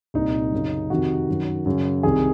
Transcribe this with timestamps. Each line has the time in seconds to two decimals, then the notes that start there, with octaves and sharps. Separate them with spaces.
0.14 C2 A#2 D#4
0.52 F#2 C#3
0.90 F2 C3 D#3 F#4
1.29 F#2 D#3
1.66 F#2 C#3
2.03 C2 C3 D#3 G#4